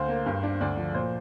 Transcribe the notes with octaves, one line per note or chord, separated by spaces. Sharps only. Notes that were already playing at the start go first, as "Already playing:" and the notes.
Already playing: D2 C5 F5
A#3
G2
D4
D2 D5
F3
A#2 C5